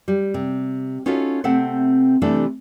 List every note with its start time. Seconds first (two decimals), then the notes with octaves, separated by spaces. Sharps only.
0.08 G3
0.34 C3
1.06 C#4 D#4 F4 F#4 A4 E5
1.44 C3 A3 C4 A4 E5 F#5
2.22 C3 E3 G3 A3 D4 A4